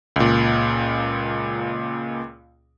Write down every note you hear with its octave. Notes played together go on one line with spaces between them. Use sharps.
C#2 A#2